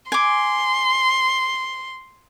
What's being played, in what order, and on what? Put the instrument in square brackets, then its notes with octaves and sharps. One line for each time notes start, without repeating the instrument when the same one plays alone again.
[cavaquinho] G#5 D6 [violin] C6